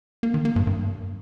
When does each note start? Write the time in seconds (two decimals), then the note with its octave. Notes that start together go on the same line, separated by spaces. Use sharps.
0.23 A#3
0.34 D#3
0.45 A#3
0.56 G2
0.67 G2